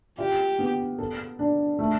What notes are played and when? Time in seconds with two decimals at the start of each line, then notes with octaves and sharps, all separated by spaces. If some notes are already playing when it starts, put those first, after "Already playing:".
0.18 F4 G4
0.59 B3
0.99 A4
1.39 D4
1.79 A3